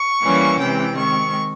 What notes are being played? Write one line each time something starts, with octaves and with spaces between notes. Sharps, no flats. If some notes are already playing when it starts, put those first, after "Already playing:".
Already playing: C#6
E3 G3 A#3 C#4
C3 E3 G#3 G5
D#3 G#3 C4 C#6